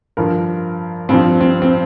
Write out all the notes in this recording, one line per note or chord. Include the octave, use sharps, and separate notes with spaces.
G2 F3 A#4
G2 F3 C4
C4
C4